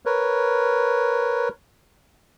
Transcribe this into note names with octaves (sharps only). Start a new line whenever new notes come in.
A#4 B4 C#5